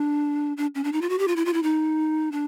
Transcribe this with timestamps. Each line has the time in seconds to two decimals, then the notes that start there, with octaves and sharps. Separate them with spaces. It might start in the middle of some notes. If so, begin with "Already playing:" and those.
Already playing: D4
0.57 D4
0.75 C#4
0.84 D4
0.92 D#4
1.01 F4
1.09 F#4
1.19 G4
1.28 F4
1.36 E4
1.45 F4
1.53 E4
1.63 D#4
2.32 D4